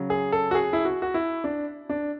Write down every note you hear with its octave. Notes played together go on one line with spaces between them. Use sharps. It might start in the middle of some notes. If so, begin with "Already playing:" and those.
Already playing: C#3 F#3
G#4
A4
F#4
G#4
E4
F#4
F#4
E4
D4
D4